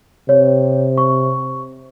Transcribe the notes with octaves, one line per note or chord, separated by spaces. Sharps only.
C3 C#5
C#6